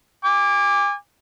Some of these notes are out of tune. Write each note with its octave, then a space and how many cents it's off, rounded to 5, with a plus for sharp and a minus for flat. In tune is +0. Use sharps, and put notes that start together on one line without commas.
G#5 -35 D6 +0